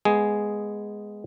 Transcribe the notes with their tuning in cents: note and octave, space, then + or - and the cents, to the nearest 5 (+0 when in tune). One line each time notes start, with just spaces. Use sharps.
G#3 +0 B3 +0 G#4 +0